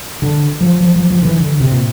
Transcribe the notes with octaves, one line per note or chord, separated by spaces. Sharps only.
D3
F3
F3
F3
F3
D3
E3
D3
C3
A#2